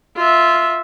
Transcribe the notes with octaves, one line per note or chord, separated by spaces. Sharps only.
F4 E5